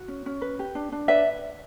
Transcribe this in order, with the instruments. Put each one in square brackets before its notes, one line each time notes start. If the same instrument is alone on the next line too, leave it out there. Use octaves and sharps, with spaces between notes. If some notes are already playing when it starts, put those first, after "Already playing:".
Already playing: [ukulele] F#4
C#4
C#4
B4
G4
D4
D4
B4 D5 E5